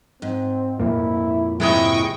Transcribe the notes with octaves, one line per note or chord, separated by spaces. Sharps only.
G#2 C4
F2 A#2 A#3 E4
G#2 C3 G#3 E4 D#5 G5 C#6